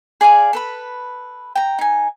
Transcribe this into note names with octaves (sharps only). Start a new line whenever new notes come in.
G#4 D5 F5 G#5
A4 B4 B5
G5 A#5
D#4 G#5